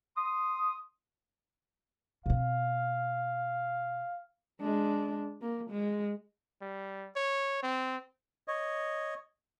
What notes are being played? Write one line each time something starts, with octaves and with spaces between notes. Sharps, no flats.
C6 D#6
B2 C4 F5
G#3 D4
A#3
G#3
G3
C#5
C4
C#5 D#5